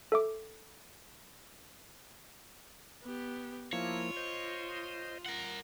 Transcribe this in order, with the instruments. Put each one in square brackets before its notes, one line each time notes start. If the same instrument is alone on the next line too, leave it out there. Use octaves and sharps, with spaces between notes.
[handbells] A4 E5 D6
[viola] B3 G4
[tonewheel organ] F3 A#3 E4 [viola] F4 [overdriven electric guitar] C#5
[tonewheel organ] C5 D#5
[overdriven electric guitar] A#4 F#5